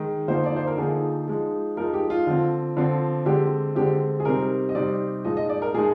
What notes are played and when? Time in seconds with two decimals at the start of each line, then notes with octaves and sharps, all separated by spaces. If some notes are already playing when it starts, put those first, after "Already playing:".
Already playing: D#3 G#3 D#4
0.28 D3 F3 A#3 D#4 C5
0.46 D5
0.56 C5
0.67 A#4
0.78 D3 F3 A#3 D#4 G#4
1.28 F3 G#3 D#4
1.77 F3 G#3 D#4 A#4
1.94 G4
2.10 F4
2.27 D3 F3 C4
2.77 D3 F3 C4
3.26 D3 G#3 C4 G4
3.75 D3 G#3 C4 G4
4.20 G#4
4.25 C3 G3 C4 D#4 A#4
4.69 D#5
4.75 C3 G3 C4 D#4 D5
5.24 A#2 F3 G#3 D#4 D#5
5.37 D#5
5.49 D5
5.62 A#4
5.74 A#2 F3 G#3 D#4 G#4